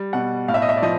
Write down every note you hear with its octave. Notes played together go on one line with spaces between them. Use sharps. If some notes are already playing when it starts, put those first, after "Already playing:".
Already playing: G3
B2 F#5
A2 F5
E5
D#5
E5
D5
F3 D#5